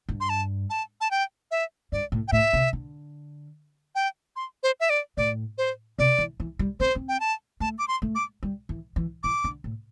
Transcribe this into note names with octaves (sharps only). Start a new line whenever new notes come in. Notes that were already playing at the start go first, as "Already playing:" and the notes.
G2
C6
A5
A5
A5
G5
E5
G2 D5
A2
G5
A2 E5
C3
D3
G5
C6
C5
E5
D5
A2 D5
C5
C3 D5
E3
E3
G3
C4 C5
C4
G5
A5
A3 A5
D6
C6
A3
D6
G3
E3
E3
E3 D6
D3
A2